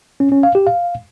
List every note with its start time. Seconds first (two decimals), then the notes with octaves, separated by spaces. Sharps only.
0.20 C#4
0.32 C#4
0.43 F5
0.55 G4
0.67 F5